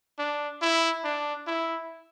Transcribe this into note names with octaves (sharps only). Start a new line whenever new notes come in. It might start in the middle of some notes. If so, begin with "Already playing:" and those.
D4
E4
D4
E4